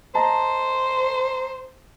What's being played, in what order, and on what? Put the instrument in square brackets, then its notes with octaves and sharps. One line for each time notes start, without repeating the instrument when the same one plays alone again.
[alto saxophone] C5 [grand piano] D#5 A5 A#5